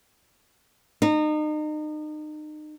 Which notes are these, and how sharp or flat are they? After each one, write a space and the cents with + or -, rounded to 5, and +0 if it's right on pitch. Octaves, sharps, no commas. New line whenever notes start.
D#4 -35